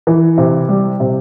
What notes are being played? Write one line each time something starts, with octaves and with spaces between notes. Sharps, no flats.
E3
C3
G3
C3